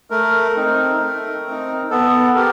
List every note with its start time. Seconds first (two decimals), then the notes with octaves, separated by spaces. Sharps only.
0.10 A3 A#4
0.56 C4 D#4
1.01 A3
1.46 C4 D#4
1.90 B3 A4
2.35 G4 A#4